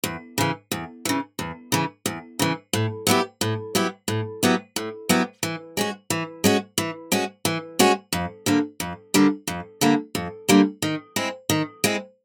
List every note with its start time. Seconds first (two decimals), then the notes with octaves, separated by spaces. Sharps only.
0.04 E2
0.38 C#3 E3
0.71 E2
1.05 C#3 E3
1.39 E2
1.72 C#3 E3
2.06 E2
2.39 C#3 E3
2.73 A2
3.07 F#3 B3 E4 G4
3.41 A2
3.75 F#3 B3 E4 G4
4.08 A2
4.43 F#3 B3 E4 G4
4.76 A2
5.09 F#3 B3 E4 G4
5.43 E3
5.77 G#3 C#4 F#4
6.10 E3
6.44 G#3 C#4 F#4
6.78 E3
7.12 G#3 C#4 F#4
7.45 E3
7.79 G#3 C#4 F#4
8.13 F2
8.46 D3 G3 A#3
8.80 F2
9.14 D3 G3 A#3
9.47 F2
9.81 D3 G3 A#3
10.15 F2
10.49 D3 G3 A#3
10.82 D#3
11.16 G#3 C4 E4
11.50 D#3
11.84 G#3 C4 E4